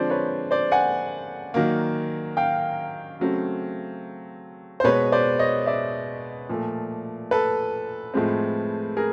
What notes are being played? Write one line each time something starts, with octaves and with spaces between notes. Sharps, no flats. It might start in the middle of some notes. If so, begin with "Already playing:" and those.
Already playing: D3 F3 G#3 C4 C5 D5
B4 C#5
C5 D5
F#5 G#5
D#3 F#3 A#3
F5 G5
C#3 F#3 A3 C4
C5
B2 G#3 B3 B4 C#5
C5 D5
C#5 D#5
D5 E5
A#2 F3 A3
A4 B4
A2 F3 G#3 C4
G#4 A#4